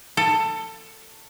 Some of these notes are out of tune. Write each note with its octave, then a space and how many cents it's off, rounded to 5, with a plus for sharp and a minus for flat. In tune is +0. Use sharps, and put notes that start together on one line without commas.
A4 +20